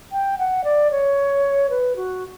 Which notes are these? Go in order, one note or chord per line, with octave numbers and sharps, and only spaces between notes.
G5
F#5
D5
C#5
B4
F#4